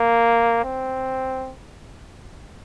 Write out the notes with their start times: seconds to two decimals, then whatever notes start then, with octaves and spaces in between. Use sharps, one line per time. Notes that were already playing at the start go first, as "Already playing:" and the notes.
Already playing: A#3
0.64 C4